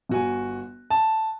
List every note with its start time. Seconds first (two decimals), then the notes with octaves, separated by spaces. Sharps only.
0.09 G1 F#4 G#5
0.90 A5